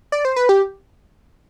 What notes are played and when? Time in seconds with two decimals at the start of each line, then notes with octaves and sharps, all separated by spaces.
0.12 D5
0.25 C5
0.36 B4
0.49 G4